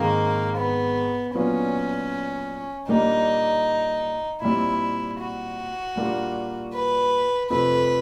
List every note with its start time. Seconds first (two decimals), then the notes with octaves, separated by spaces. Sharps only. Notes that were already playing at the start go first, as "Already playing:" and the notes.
Already playing: G#2 D#3 G#3 A#3 C4
0.57 B3
1.35 A#2 F#3 B3 C#4 D4 F4
2.88 A#2 G3 A#3 D4 D#4
4.42 A#2 G3 C4 E4
5.19 F#4
5.96 A#2 G3 A#3 D4 F4
6.74 B4
7.50 F2 C3 F3 A3 B4